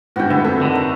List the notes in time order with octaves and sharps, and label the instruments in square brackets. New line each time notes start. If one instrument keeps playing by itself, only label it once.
[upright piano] G#1 G2 [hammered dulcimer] F#4 B4 G5
[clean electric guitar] D2 [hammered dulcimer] E4
[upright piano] F2 A4 [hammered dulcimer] E5
[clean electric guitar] D3 D#3
[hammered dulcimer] A3 A#5